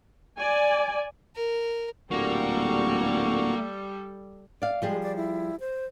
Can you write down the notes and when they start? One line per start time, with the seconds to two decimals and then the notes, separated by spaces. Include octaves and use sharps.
0.37 D5 G#5
1.35 A#4
2.11 D1 A#2 G3 A#3 F#4 A4 C#6
4.62 D5 F5
4.82 F3 G3 G#3 G#4
5.03 D5
5.16 E4
5.60 C5